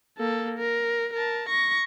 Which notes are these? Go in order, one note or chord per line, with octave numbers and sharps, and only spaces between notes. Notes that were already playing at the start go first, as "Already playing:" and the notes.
A#3 A4
A#4
A#4 A5
C#6 A#6